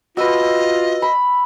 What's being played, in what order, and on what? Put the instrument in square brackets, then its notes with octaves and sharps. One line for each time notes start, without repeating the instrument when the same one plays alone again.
[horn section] F4 [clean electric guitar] F#4 B4 [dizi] D#5 [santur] E5
[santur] B5